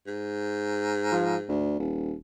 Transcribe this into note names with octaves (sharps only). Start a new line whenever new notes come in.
G#2
F3
D2
D#1